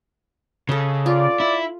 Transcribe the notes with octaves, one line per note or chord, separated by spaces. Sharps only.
C#3 A4 D#5
F4 D5
E4